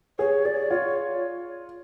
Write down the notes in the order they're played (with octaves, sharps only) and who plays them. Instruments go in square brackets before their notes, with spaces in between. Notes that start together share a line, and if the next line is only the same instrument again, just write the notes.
[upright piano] G#4 [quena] C#5
[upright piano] G#4 [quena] D5
[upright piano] F4 [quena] C#5